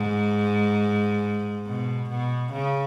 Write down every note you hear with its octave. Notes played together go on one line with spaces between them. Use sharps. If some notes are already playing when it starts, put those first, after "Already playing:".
Already playing: G#2
B2
B2
C#3